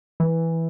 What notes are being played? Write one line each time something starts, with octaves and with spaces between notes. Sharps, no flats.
E3